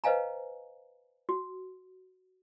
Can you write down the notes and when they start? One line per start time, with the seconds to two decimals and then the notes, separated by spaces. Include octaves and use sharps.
0.04 B4 C5 D#5 F5 G#5 A#5
1.29 F#4